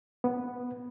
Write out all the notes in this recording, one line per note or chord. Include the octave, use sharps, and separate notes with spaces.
B3